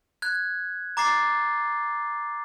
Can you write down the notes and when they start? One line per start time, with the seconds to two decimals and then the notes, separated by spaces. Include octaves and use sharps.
0.22 F#6 G#6
0.97 A#5 D6 A6 C7